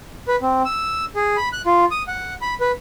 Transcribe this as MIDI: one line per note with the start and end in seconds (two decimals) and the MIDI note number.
0.28 0.36 71
0.42 0.62 60
0.65 1.05 88
1.16 1.37 68
1.37 1.49 83
1.53 1.62 90
1.66 1.85 65
1.91 2.03 87
2.08 2.34 78
2.41 2.54 83
2.60 2.72 71